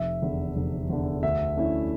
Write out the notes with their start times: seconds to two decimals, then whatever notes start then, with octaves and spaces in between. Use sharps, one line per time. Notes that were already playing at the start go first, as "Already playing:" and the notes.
Already playing: F1 E5
0.22 E2 D3
0.57 F1
0.90 E2 D3
1.23 D2 E5
1.57 D3 A3 C#4 E4